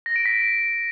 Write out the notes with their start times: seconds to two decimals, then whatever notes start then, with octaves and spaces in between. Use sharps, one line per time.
0.06 A#6
0.16 D7
0.25 B6